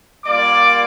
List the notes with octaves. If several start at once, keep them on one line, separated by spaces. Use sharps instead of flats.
G3 A#3 F4 D5 D6